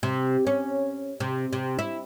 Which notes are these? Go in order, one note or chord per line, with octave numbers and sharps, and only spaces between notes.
C3
C#4
C3
C3
E4